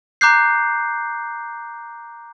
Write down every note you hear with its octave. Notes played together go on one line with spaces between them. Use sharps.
A#5 D6 F#6 G6 C7